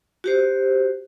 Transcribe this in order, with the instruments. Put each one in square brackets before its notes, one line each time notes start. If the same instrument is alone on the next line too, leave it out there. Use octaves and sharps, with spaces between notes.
[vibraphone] F#4 G4 C5